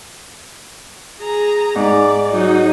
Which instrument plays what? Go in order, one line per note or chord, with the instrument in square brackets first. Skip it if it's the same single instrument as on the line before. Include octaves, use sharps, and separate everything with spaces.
[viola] G#4 A#5
[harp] G#2 [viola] D5
[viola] F#3 D#4